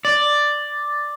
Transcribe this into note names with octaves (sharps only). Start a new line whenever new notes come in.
D5